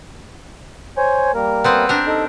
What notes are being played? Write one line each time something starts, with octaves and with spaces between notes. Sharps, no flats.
C5 C#5 G#5
G3 A#3 A#4
B3 C4 B4
D4 G4 A#4
D#4 A4